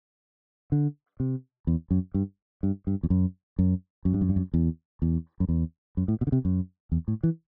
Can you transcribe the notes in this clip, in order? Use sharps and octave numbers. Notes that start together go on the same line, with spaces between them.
D3
C3
E2
F#2
G2
G2
G2
E2
F#2
F#2
F#2
G2
F#2
G2
F#2
E2
E2
F#2
E2
F#2
A2
B2
D3
C3
F#2
E2
A2
E3